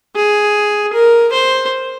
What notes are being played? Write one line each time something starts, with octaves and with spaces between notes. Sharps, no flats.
G#4
A#4
C5